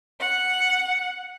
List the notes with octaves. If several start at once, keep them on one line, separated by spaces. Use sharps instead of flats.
F#5